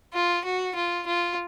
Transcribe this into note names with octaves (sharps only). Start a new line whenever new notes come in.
F4
F#4
F4
F4